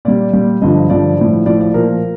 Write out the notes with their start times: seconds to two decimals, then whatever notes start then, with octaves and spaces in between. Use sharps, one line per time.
0.05 A#2 G3 D5
0.33 A#2 G3
0.62 G2 D3 F3 D#5
0.90 G2 D3 F3 D5
1.19 A2 F3
1.46 A2 F3 D5
1.61 D5
1.74 A#2 F3 A#4